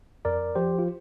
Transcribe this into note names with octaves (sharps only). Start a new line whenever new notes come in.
F2 A#4 D5
F3 G4 C5
F4